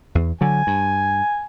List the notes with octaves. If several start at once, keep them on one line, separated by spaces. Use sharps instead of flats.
E2
D3 F#3 G#5
G2